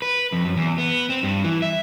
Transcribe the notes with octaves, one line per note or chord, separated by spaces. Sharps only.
B4
F2
F#2
E2
B3
C4
G2
E3
E5